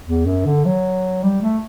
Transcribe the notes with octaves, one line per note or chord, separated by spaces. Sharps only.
E2
F#2
D3
F#3
G3
A3